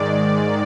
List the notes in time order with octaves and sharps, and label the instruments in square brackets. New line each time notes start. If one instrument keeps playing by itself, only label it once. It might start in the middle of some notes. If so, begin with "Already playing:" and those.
Already playing: [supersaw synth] G#2 D#3 G#3 D5